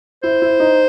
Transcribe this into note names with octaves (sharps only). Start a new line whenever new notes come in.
E4 C5
E4
D#4